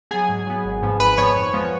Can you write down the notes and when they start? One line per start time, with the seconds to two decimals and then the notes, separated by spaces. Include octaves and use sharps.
0.11 F#3 B3 G#4 G#5
0.29 G#2
0.47 F#3 B3
0.65 G#1
0.82 G#2 F3 B3
1.00 G#1 B4 B5
1.18 G#2 F3 B3 C#5 C#6
1.36 F2
1.53 F3 G#3 B3